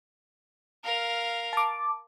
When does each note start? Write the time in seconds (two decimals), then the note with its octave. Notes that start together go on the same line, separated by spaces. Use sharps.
0.84 A#4 F5
1.53 A5 D6